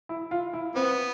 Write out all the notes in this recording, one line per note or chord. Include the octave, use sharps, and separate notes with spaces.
E4
F4
E4
B3 C4